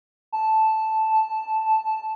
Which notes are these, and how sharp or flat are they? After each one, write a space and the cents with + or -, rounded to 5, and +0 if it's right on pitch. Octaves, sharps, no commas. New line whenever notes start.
A5 -5